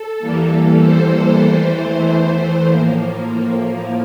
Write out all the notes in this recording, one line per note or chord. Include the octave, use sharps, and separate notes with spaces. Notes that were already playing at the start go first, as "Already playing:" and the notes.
Already playing: A4
E2 E3 G3 A#3
C5
E2 E3 A3
A2 F3 A#3